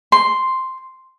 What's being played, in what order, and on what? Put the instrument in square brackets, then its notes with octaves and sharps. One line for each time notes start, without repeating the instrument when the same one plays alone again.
[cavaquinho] C6